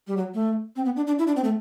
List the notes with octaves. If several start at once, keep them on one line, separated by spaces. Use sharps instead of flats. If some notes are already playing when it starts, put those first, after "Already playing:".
G3
F#3
A3
C4
B3
D4
D4
E4
D4
C4
A3